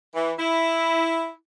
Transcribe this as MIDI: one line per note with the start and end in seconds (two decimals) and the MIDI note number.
0.15 0.33 52
0.38 1.33 64